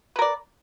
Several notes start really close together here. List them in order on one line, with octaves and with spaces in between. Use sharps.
B4 A#4 D5